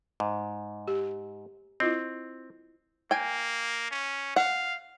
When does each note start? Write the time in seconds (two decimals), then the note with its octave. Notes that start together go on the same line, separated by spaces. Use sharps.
0.20 G#2
0.88 G4
1.80 C4 E4 F4 D#5
3.11 A#3 G5 G#5
3.91 C#4
4.36 F5 F#5